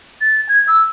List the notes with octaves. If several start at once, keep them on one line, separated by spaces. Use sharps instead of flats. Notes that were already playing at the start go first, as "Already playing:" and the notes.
A6
G#6
E6